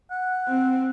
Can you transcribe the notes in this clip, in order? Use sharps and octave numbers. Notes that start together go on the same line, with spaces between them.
F#5
C4